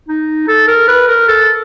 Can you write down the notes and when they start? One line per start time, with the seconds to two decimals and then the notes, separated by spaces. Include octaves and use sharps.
0.08 D#4
0.48 A4
0.68 A#4
0.88 B4
1.08 A#4
1.28 A4